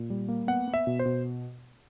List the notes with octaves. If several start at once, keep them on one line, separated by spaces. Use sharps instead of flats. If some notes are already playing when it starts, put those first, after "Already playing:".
Already playing: A#2
G3
A#3
B3 F#5
B3
E5
B2
C5
B2